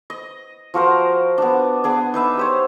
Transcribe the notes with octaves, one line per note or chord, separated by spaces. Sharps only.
D#5
F3 F#4 A#4 C5
B3 D4
B3 D4 G#4
D#4 B4 E5
G4 C5 C#5